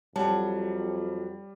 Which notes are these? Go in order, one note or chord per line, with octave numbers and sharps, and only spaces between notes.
F2 F#3 G3 A5